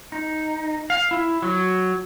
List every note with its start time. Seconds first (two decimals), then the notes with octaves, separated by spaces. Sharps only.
0.12 D#4
0.90 F5
1.11 E4
1.42 F#3